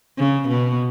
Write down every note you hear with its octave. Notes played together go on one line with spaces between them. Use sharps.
C#3
B2